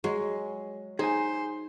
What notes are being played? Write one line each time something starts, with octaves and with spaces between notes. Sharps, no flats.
F#3 G#3
D#4 G#4 C5 G#5